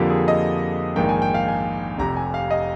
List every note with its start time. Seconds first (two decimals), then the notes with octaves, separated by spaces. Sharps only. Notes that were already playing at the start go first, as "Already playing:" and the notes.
Already playing: F2 D3 F3 A#3 G4
0.10 G#4
0.28 D#5
0.96 A#1 G#2 D#3 A#3 G5
1.09 G#5
1.22 G5
1.34 F5
1.48 G#5
1.98 F1 F2 C3 A#5
2.16 G#5
2.34 F5
2.51 D#5